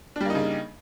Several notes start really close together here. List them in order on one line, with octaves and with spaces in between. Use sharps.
D4 G3 A#3 D#4 C#3